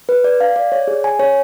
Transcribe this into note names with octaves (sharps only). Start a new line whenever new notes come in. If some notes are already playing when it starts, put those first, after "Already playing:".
B4
D5
F5
D5
C#5
G#4
G#5
C#5